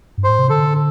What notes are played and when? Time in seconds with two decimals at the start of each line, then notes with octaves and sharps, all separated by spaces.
0.18 G2
0.24 A2 C5
0.39 C3
0.50 D3 A4